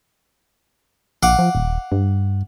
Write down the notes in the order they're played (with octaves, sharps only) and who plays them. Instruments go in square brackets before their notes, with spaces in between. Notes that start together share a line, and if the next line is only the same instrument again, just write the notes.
[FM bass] A#1 [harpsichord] F5 F#5 D6
[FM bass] F3
D#1
G2